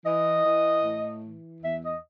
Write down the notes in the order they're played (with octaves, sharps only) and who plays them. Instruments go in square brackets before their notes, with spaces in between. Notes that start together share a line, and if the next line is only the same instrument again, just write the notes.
[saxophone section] E3 D#5
E3
A2
E3
E2 E5
D#5